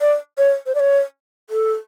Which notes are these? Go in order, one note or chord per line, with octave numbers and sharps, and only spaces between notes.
D5
C#5
C5
D5
C#5
A4